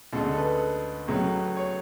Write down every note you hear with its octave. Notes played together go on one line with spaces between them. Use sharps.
D2 C#3 G#3 A4
A4
B4
C#2 C#3 F#3 A3
C#5